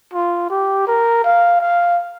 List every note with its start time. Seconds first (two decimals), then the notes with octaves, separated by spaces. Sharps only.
0.14 F4
0.51 G4
0.87 A#4
1.24 F5
1.61 F5